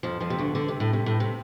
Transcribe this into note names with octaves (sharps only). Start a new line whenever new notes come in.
F2 F3
F2 F3
C3
D2 D3
D3
C3
A2
C3
A2
C3